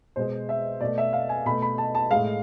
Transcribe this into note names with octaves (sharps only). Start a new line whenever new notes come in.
B2 G#3 C5
E5
B2 A3 D5
E5
F5
G#5
B2 A3 B5
B5
A5
A5
A2 G#3 F5